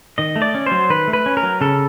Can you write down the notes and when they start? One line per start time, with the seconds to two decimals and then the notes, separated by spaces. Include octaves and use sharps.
0.18 D#3 D#5
0.36 A3
0.42 D5
0.55 C#4
0.66 F#3 C5
0.90 D#3 B4
1.08 A3
1.13 B4
1.26 C#4
1.37 A#4
1.43 F#3
1.61 C#3 A4